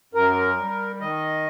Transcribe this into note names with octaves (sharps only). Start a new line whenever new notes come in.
F#2 A#4
G3
D#3 D#5